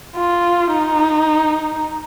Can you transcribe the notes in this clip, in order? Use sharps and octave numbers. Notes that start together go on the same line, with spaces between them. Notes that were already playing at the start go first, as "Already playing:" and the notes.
F4
D#4